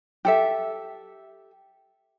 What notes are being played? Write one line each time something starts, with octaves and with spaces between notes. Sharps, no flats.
G4 A4 E5